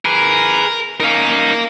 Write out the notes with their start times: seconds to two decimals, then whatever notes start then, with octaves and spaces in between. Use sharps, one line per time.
0.05 G#4 A#4 B4
1.00 C#4 D#4 A#4 F5